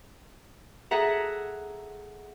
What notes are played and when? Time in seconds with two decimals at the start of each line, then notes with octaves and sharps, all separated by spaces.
0.91 G#4 A4 E5 F#5 A#5